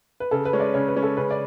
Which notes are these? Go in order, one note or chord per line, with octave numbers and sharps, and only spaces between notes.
B4
C#3 A4
B4
G#3 C#4
D5
C#3 C#5
B4
G#3 C#4
A4
C#3 B4
D5